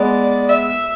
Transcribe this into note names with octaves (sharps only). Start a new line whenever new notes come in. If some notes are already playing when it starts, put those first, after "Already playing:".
Already playing: G#3 B3 D5
E5